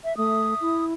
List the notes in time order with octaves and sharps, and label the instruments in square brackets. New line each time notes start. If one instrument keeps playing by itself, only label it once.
[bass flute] E5
[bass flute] A3 [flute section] E5 D#6
[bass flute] E4